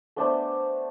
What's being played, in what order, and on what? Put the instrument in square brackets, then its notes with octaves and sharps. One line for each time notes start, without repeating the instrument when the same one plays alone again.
[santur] A3 B3 D4 C5